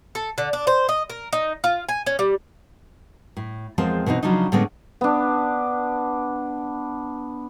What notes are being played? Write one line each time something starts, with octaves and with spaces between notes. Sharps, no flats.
A4
D3
D4
C5
D#5
A#4
D#4
F4
G#5
C#4
G3
A2
E2 F3 G#3 C4 A#4 A5
B2 E3 C4 D#4
C#3 F3 F#3 D4 D#4
A2 D3 G#3 A3 B3 C#4
B3 D4